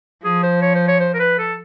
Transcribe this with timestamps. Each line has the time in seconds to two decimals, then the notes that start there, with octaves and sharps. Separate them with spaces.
0.24 F3 G#4
0.43 C5
0.62 C#5
0.75 C5
0.88 C#5
1.00 C5
1.14 A#4
1.19 B4
1.38 A4